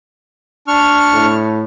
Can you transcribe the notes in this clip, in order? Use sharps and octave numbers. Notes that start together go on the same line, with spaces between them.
D4 C#6 F6
A2